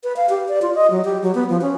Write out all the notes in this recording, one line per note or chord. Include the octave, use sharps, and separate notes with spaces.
B4
F5
G4
D5
F4
D#5
F#3
G4
F#3
B3
F3
C#4